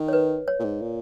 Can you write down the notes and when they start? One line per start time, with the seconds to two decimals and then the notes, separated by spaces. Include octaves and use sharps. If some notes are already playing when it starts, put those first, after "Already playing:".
Already playing: D#3
0.08 C#5
0.13 B4
0.48 C#5
0.59 A#2
0.64 G#2
0.81 A#2